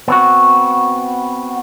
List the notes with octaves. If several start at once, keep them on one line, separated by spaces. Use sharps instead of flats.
B3 C4 F#4